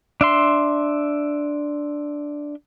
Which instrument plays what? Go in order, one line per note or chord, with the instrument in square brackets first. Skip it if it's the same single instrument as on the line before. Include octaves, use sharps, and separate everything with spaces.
[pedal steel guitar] D4 E5 C6